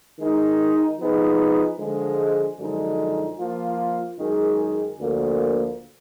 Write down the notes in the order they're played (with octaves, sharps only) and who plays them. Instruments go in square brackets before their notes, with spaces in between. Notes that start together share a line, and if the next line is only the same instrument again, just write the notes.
[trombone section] D#3 G#3 D#4
F3 B3 D#4 G#4
D3 F3 G#3
F#2 D3 F3 G#3 D#4
F3 A#3 F4
F#2 D#3 G#3 D#4 G#4
D2 D3 F3 A#3